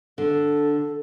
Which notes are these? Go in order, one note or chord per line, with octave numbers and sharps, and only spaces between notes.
D3 A4